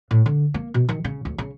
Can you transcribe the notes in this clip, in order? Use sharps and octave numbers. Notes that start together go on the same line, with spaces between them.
A2
D3
A#3
B2
D#3
C#3
D2
C#3